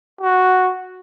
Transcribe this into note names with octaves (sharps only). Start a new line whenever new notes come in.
F#4